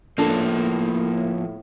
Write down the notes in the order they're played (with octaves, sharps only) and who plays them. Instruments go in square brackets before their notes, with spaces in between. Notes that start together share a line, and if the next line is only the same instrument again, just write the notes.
[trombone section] A2 [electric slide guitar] F3 B3 [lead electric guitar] A#3 [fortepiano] D4 A4 A5